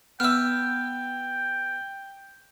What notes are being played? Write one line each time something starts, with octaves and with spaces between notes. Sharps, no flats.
B3 E5 G5 E6 F6